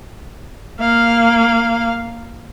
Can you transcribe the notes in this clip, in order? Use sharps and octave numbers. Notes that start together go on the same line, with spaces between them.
A#3 F5